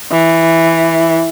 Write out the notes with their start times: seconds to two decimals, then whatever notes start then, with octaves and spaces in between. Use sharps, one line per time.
0.12 E3